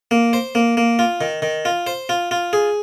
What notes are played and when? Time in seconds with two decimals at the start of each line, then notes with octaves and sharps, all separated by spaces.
0.11 A#3
0.33 C5
0.55 A#3
0.77 A#3
0.99 F4
1.21 D#3
1.42 D#3
1.65 F4
1.87 C5
2.09 F4
2.31 F4
2.53 G#4